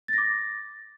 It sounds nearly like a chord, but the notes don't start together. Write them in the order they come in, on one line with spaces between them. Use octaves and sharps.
A6 A#6 D6